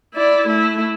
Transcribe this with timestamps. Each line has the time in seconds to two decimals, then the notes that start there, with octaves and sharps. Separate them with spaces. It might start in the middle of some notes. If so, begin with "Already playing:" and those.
0.14 E4 D5
0.48 A3 E4